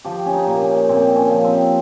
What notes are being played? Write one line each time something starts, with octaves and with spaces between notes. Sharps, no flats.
F3 G4
C#4
D#4
A#2
C#4
A#2 C4
C#4
F3
C4